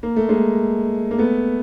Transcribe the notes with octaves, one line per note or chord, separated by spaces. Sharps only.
A#3
A3
G#3 A#3
A#3
A3 B3